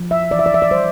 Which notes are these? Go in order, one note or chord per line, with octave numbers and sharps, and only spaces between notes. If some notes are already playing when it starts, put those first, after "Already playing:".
Already playing: F3
E5
E3 D5
E5
D5
E5
D5
G3 C5